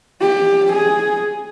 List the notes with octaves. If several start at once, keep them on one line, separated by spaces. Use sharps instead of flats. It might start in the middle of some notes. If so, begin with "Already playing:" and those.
G4
G#4